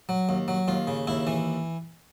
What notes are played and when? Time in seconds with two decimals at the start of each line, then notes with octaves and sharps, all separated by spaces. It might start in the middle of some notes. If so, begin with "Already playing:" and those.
0.09 F#3
0.29 D#2
0.48 F#3
0.68 D#2 F4
0.87 C#3
1.07 D#2 E4
1.27 E3